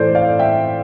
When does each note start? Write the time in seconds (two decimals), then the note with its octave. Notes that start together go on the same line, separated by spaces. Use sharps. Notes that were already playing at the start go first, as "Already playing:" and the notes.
Already playing: A2 E3 A4 C5 D5
0.15 D5 F5
0.39 E5 G5